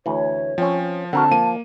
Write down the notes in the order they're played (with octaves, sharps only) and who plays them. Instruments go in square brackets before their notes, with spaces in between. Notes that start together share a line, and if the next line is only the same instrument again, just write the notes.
[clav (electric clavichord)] D2 E3 [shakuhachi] C#5
[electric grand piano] F3 [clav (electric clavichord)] C4 C#4
[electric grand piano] D3 C4 [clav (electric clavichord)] F#4 A#4 F#5 [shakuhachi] A5
[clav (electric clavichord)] F3 [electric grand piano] A#3 D#7